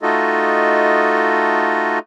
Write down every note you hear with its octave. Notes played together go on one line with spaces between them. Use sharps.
A3 D#4 F4 F#4 A4 D#5